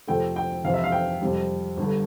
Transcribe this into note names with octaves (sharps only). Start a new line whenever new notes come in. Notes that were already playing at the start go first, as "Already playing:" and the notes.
F2 C3 F3 A3 G5
G5
F2 C3 E3 F5
E5
F5
G5
F2 C3 G3
G1 G2 D3